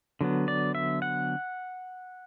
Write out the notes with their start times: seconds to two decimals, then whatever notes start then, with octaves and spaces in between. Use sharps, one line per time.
0.21 D3 F#3 B3
0.48 D5
0.75 E5
1.02 F#5